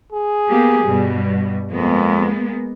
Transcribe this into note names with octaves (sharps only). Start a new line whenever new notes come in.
G#4
A#3 B3 G4
G2 B2 G3
F2 G#3 A#3 B3